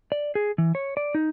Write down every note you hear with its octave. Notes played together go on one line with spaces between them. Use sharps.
D5
G#4
E3
C#5
D5
D#4